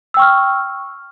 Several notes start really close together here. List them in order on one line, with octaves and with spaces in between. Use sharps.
E6 G5 C#6 F6